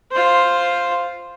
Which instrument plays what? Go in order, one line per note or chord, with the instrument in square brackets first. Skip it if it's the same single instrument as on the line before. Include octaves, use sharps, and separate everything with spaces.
[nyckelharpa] F4 C5